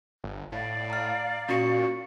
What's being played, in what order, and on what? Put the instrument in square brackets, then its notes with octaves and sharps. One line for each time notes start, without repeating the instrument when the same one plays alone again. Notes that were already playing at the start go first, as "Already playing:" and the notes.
[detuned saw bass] G1
[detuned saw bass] A2 [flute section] D5 F5
[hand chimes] A#5 F6
[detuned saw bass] A#2 [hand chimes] C#4 C#6 C#7 [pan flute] F#4